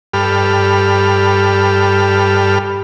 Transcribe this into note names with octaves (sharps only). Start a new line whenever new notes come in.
G2 G4 A4 B5 F6